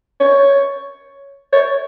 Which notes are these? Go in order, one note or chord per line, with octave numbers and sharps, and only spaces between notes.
C#5
C#5